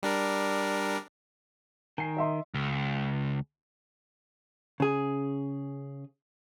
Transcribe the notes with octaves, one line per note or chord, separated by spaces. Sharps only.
G3 D4 A#4
D#3 A#4 G5 G#5 C7
D#5 E5 C6
C#2
C#3 G#4